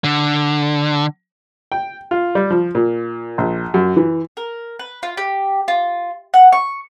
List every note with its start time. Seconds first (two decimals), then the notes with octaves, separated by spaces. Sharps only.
0.04 D3
1.72 G5
2.11 F4
2.35 G3
2.51 F3
2.75 A#2
3.38 A#1
3.74 F#2
3.97 E3
4.37 A#4
4.79 B4
5.03 F4
5.17 G4
5.68 F4
6.34 F#5
6.52 C#6